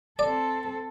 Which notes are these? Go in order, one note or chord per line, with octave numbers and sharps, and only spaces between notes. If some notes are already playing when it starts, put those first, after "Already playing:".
C4 A4 D5